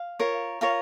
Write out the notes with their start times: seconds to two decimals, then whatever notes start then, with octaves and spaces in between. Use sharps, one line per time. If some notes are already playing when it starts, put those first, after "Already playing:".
Already playing: F5
0.19 F4 A#4 C#5
0.61 F4 A#4 C#5 F5